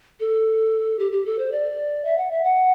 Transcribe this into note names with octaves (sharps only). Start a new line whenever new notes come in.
A4
G4
G4
A4
C5
D5
E5
F#5
E5
F#5